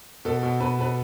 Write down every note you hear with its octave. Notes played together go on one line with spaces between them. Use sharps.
B2 A4
B2
B2 B4
B2 B4